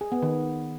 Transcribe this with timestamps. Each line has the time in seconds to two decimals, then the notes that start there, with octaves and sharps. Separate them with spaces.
0.01 G#4
0.12 B3
0.23 D#3